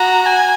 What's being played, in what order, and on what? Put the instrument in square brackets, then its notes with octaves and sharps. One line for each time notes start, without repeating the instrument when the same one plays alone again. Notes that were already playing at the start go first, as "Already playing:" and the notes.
Already playing: [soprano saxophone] F#4 [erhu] A#5
[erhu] G#5